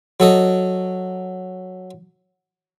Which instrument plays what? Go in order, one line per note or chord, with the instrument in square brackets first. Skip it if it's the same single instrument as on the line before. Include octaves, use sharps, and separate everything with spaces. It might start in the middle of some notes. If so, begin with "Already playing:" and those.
[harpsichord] F#3 A4 D#5